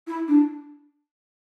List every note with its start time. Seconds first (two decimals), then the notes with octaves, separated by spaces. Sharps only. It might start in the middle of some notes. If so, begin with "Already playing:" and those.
0.07 E4
0.28 D4